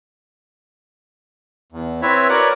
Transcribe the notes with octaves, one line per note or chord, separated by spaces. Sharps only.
E2
C4 E4 B4 C#5 E5
F#4 A#4 B4 C#5 D5 F#5